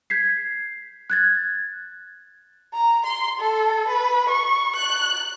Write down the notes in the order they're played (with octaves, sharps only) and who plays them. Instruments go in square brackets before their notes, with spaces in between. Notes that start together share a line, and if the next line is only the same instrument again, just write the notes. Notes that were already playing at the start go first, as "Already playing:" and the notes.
[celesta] G6 G#6 B6 C7
F#6 G#6 A6
[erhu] A#5
C6
A4
B4
C#6
F#6